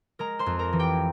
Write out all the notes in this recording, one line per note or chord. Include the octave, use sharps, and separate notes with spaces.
G#3 A#4 A#5
C5 C6
F2
A#4 A#5
E3
G4 G5